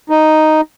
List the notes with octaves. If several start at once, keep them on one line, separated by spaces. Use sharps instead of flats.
D#4